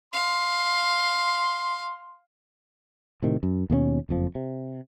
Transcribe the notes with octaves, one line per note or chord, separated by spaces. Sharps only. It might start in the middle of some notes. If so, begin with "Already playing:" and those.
F5 C6
A2 C3 D#3
F#2
D#2 B2 G#3 C#4
F#1 F2 F3
C3